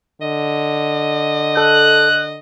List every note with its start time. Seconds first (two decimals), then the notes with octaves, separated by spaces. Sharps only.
0.21 D3 D#5
1.57 A4 F#6